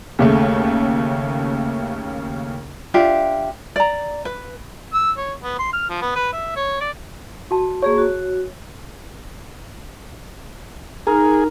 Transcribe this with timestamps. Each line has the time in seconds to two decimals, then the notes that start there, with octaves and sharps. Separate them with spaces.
0.19 D#2 C#3 A3
2.94 D4 F4 G4 E5
3.76 D5 A#5
4.25 B4
4.93 E6
5.17 C#5
5.43 B3
5.59 C6
5.73 F6
5.90 F3
6.02 B3
6.16 B4
6.33 E5
6.56 C#5
6.81 D5
7.51 F#4 A5
7.82 A#3 G#4 C#5 C#6
7.98 F#4
11.07 D#4 G#4 A#4